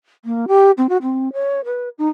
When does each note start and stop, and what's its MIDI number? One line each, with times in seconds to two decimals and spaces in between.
0.25 0.46 58
0.48 0.71 67
0.78 0.87 60
0.89 0.97 66
1.02 1.32 60
1.33 1.61 73
1.65 1.89 71
1.98 2.09 63